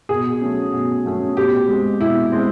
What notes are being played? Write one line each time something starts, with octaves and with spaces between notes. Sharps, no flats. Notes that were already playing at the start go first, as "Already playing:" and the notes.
B2 G#4
F#3 A3 C#4
B2
F#3 A3 C#4
B2 G4
G#3 C4
B2 E4
G#3 C4